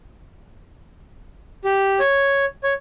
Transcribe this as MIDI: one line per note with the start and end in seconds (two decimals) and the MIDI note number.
1.65 1.99 67
1.99 2.45 73
2.64 2.73 73